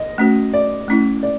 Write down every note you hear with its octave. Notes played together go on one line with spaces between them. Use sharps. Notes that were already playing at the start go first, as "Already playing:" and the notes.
Already playing: D#5
A3 C#4 F#4
D5
A3 C#4 E4
D5